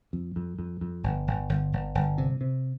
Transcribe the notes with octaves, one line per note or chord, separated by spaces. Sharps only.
F2
F2
F2
F2
G1
G1
G1
G1
G1
C3
C3